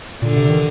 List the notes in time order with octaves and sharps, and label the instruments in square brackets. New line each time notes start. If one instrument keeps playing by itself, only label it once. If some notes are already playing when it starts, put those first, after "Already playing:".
[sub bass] A#2 [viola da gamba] D3
[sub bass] C3
D#3